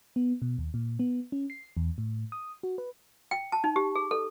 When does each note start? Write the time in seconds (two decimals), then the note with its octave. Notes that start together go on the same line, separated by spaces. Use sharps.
0.16 B3
0.42 B2
0.58 D#2
0.74 A#2
0.99 B3
1.32 C#4
1.50 C7
1.77 E2
1.98 A2
2.32 D#6
2.63 F#4
2.78 B4
3.31 G5
3.52 A5
3.64 D#4
3.76 G4
3.96 G#4
4.11 A4